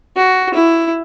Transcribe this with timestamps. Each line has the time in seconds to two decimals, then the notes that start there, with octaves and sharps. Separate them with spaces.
0.17 F#4
0.54 E4